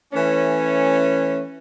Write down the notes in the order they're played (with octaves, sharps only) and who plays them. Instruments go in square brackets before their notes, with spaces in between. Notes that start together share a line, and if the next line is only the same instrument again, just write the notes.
[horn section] E3 A3 C#4